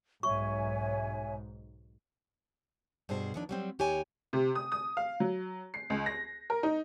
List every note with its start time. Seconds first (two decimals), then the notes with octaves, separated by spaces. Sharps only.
0.23 B1 G#2 C#5 E5 G#5 C#6
3.09 G2 B2 G#4 C5
3.34 D#2 F3 D4
3.49 F#3 G3 C4
3.79 D#2 G4 C#5 G#5
4.33 C3
4.55 D#6
4.72 D#6
4.97 F5
5.20 F#3
5.74 C7
5.90 C#2
6.06 A#6
6.50 A#4
6.63 D#4